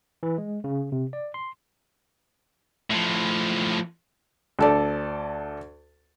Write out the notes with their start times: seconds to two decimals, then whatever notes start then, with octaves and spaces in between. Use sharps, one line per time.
0.23 E3
0.38 G#3
0.64 C#3
0.92 C3
1.13 D5
1.34 C6
2.91 A2 F3
4.59 D2 A4 D5